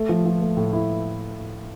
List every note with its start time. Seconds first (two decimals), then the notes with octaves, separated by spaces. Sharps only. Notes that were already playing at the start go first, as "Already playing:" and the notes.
Already playing: A3
0.09 F3
0.25 F3
0.41 A3
0.57 A2
0.73 E4